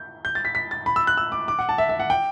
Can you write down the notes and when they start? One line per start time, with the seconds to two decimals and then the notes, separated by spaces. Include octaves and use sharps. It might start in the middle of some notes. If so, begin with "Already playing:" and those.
Already playing: G6
0.25 G6
0.35 A6
0.45 B6
0.55 B6
0.71 A6
0.86 B5
0.96 E6
1.07 F#6
1.17 E6
1.32 D6
1.48 D6
1.59 F#5
1.69 A5
1.78 E5
1.89 E5
2.00 F#5
2.10 G5